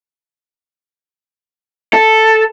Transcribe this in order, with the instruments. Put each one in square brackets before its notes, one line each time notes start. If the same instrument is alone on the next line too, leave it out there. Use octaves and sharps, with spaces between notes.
[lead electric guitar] A4